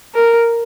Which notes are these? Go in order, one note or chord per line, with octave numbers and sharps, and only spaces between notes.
A#4